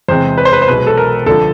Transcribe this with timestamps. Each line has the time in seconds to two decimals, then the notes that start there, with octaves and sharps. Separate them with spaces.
0.08 E2 C3 E3 G#3 C4 C5
0.38 B4
0.45 C5
0.53 B4
0.62 C5
0.68 B1 B2 G#3 B4
0.87 A4
0.98 A#4
1.26 D2 D3 F3 A4